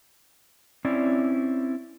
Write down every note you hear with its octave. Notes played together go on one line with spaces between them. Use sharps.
C4 C#4 E4 D5